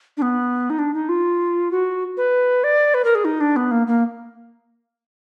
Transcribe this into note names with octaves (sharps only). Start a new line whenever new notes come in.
D4
B3
D#4
D4
D#4
F4
F#4
B4
D5
B4
A#4
G#4
D#4
D4
B3
A#3
A#3